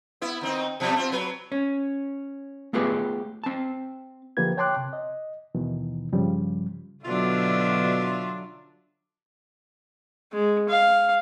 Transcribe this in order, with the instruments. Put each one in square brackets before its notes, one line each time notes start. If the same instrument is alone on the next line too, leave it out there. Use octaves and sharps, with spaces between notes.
[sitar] B3 E4
D#3 C4 D#4
B2 F3 G3
C4 F4
F#3 B4
[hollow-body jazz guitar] C#4
A3 B3 F4 G4 G#4 B4
C4 A5
[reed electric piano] D3 F3 A#3 G4 B4 G#6
C#5 G5 A5 C6 D6 F#6
C3
D#5
D#2 B2 D#3 E3
G2 C#3 F3 G3
[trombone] B2 [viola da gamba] D3 F#3 D4 [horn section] F4 E5
[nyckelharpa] G#3
F5